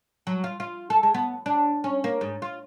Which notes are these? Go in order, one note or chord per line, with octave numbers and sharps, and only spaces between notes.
F#3
F4
F4
A4
G#3
B3
D4
C#4
A#3
G#2
F4